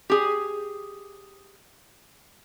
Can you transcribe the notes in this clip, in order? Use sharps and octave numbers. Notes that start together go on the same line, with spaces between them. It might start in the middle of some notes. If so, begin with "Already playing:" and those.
G4 G#4